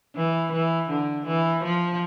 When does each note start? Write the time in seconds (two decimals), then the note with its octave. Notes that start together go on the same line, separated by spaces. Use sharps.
0.15 E3
0.52 E3
0.89 D3
1.27 E3
1.63 F3